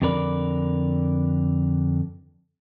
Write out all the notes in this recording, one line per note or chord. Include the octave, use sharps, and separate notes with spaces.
F2 D3 A#4 B4 D5